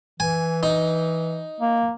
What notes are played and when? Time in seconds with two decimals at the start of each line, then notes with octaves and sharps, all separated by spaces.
0.20 E3 G#5
0.63 D#4
1.61 A#3